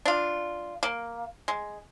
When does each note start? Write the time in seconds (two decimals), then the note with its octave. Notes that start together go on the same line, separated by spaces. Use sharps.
0.05 D4 F4
0.83 A#3
1.48 G#3